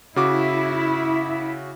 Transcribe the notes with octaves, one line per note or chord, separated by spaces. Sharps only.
C#3 E4 F#4 D6